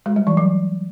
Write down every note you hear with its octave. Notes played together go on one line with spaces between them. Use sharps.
G#3
G3
E3
F#3